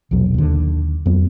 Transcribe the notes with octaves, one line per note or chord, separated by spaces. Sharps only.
A#1 E2 B2 F#3
D#2 D3
F2 F#3 B3